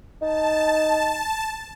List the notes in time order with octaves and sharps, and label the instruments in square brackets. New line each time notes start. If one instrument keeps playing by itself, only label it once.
[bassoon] D#4 [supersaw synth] A5